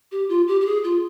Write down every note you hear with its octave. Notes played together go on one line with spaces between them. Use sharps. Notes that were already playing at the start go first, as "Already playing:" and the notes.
G4
F4
G4
G4
G#4
F4